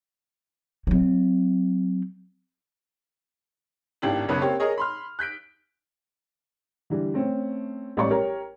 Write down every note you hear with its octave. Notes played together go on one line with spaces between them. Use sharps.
F#3 C4
G#1 A2 D4 G4 F#7
F#1 B1 C#3 B3 B4 C#5
A#3 C4 G4 C#5
G#4 A#4 C#5 D#5
B5 C6 F6
F#6 G6 B6 D7
D3 E3 G3
A3 C4 C#4
A1 G3 G#3 C#5 D5 C#6
G4 A#4 C#5